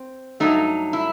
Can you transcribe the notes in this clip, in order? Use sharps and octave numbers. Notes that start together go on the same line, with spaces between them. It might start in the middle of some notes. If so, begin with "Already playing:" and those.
Already playing: C4
G2 F#3 A3 D#4
E4